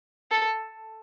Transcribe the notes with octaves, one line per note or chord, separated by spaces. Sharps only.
A4